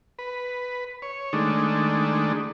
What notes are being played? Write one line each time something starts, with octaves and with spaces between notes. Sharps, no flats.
B4
C#5
D#3 G#3 A3 D4